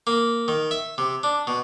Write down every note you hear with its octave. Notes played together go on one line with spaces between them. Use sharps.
A#3
D#3
E5
C3
D4
B2